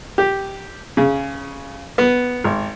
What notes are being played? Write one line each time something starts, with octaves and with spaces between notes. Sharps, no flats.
G4
C#3
B3
G#1